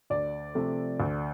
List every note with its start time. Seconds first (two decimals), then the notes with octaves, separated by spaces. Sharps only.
0.10 D2 D5
0.55 C3 F3 A3
1.00 D2